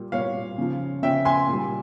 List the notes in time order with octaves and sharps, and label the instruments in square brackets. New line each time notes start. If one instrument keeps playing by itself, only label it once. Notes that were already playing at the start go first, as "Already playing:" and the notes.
Already playing: [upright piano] A#2 G3
A#2 G3 C#5 F5
C#3 F3
C#3 F3 E5 G5
G#5 C6
A#2 G3